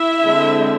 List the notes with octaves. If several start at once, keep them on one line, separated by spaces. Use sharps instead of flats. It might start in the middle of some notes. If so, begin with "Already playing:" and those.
Already playing: E4 E5
D3 G#3 C4